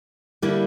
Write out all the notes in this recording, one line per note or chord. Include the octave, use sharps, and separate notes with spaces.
D3 G3 A#3 E4